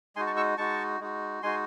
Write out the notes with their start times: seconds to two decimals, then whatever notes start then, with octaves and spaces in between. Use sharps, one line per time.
0.16 G#3 D#4 F#4 G#5 C6
0.26 A5 C#6
0.37 C#6 E6
0.58 G#3 D#4 F#4 A5 C#6
1.00 G#3 D#4 F#4
1.42 G#3 D#4 F#4 G#5 C6